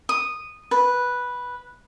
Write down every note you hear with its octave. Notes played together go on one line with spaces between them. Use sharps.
D#6
B4